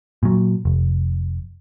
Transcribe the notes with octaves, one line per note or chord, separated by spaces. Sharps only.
A#2 F#3
F1